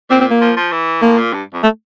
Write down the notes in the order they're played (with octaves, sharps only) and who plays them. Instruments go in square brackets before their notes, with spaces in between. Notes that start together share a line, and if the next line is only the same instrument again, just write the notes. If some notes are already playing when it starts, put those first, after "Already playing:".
[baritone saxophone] A#2 [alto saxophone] C4
[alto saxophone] C4
A#3
[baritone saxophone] F3
F3
E3
[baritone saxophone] A2 [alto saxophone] A#3
[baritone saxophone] A#2
G2
F2
[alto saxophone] A3